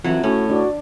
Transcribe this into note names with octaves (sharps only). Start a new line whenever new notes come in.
F2 E3 F#3 E4
A2 C#4 F#4
D4 F#4 D5